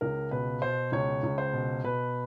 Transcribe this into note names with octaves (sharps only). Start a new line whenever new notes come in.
C#2 A#4
B2 B4
B2 C5
C#2 C#5
C#2
C5
B2
B2 B4